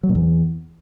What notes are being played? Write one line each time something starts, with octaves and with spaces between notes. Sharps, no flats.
F#3
A#2
E2